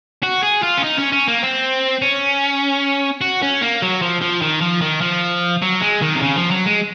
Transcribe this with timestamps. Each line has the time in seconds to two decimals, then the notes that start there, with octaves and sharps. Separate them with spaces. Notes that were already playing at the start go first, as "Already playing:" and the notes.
0.23 F#4
0.43 G#4
0.62 F4
0.77 C#4
0.83 D#4
0.98 C#4
1.12 C#4
1.28 A#3
1.43 C4
2.02 C#4
3.21 F#4
3.43 C#4
3.62 A#3
3.82 F#3
4.02 F3
4.21 F3
4.42 D#3
4.61 F3
4.81 D#3
5.01 F3
5.62 F#3
5.81 G#3
6.01 D#3
6.15 C3
6.22 C#3
6.36 F3
6.51 F#3
6.66 G#3